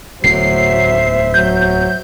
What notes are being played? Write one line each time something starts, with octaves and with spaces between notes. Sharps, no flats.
D1 E2 A2 F#3 C5 E5 C7
F#3 G6